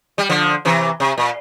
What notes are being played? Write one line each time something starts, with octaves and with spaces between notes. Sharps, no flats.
G3
D3 F3
C3 E3
C3
A#2